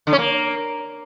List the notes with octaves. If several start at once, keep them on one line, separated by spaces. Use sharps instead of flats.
D3
C#4
A#3